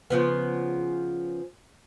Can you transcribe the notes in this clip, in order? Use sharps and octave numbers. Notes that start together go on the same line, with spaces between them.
C#3 F3 B3